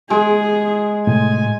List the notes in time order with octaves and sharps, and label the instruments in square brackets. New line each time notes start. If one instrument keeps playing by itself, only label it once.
[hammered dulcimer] G#3 [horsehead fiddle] G#4
[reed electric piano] A2 C3 [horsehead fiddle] G#5